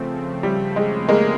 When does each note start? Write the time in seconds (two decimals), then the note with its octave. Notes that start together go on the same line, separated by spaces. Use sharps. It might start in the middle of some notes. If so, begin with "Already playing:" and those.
Already playing: C#3 F3 A3 C4
0.43 G3
0.76 G#3
1.08 G#3 A#3